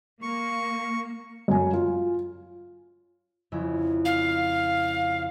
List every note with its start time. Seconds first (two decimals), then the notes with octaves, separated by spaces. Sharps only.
0.22 A#3 C#6
1.48 F#2 G#5
1.73 F4
3.52 F2 C#3 E4
4.05 F5